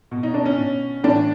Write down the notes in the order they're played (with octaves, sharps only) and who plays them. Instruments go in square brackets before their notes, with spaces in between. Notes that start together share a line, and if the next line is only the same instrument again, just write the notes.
[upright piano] B2
D#4
D4
C#4
B2
A2 E3 D4